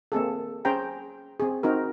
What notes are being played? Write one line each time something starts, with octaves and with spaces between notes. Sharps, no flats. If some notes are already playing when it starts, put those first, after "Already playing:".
A#3 C4 G#4 A4
C#4 G#4 C5 G5 A#5
C4 G#4
C4 D#4 F#4 A#4